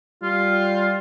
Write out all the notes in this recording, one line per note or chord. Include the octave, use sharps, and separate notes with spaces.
G3 F4